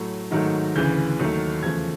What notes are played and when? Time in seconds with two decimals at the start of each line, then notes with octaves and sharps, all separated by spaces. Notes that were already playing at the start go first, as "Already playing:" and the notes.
Already playing: A2 F#3 A3
0.31 G#2 D#3 F#3 A3
0.75 D2 C#3 E3 G6
1.19 D#2 D#3 F#3 A3
1.63 E2 C#3 F3 A3 G#6